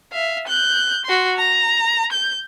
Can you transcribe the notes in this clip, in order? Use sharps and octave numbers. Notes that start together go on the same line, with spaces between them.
E5 F5
F#6 G6
F#4 C6
A#5
G6